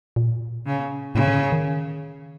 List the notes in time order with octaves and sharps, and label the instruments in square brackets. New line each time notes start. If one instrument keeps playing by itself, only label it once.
[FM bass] A#2
[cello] C#3
[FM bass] A2 [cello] C#3
[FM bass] D3
D#3